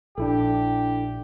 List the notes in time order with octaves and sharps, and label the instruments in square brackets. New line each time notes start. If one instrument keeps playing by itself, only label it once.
[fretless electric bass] A#1 [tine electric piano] D4 E4 A4 [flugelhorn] G4